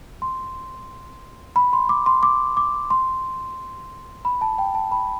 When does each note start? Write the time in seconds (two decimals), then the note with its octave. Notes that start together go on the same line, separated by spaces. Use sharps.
0.22 C6
1.56 B5
1.73 C6
1.89 D6
2.06 C6
2.23 D6
2.57 D6
2.90 C6
4.25 B5
4.41 A5
4.58 G5
4.75 A5
4.92 B5